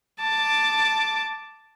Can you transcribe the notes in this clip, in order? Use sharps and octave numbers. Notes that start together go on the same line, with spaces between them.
A5 D6